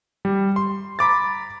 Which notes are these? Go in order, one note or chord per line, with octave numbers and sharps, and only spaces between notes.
G3
C6
A#5 B5 D6 A6